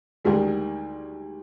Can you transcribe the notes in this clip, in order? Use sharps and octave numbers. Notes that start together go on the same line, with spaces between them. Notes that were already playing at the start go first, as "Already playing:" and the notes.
D2 D#3 G3 G#3